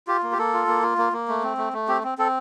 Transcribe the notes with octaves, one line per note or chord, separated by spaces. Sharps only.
F4 G4
A#3
G4
A#3 A4
F4
A#3
F4
A#3
A#3
A3
C4
A3
A3
C4 G4
C4
C4 A4